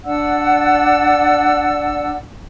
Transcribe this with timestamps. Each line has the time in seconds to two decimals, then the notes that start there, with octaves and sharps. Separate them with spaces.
0.05 D4 D5 F#5 E6